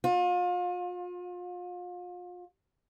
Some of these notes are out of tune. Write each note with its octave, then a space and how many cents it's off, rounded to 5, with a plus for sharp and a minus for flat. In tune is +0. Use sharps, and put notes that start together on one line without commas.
F4 +35